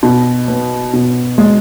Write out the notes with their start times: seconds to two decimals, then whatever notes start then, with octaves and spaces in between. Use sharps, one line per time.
0.03 B2
0.48 B3
0.93 B2
1.38 G#3